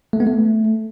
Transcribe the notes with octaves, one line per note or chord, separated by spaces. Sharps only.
A3
B3
A3